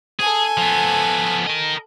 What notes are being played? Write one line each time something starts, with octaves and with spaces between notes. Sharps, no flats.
G#4 A4 G#5
F3 B3
A#4 D#5